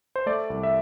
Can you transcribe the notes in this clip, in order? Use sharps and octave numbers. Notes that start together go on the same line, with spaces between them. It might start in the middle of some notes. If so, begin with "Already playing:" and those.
C5
A3 D5
C2
E5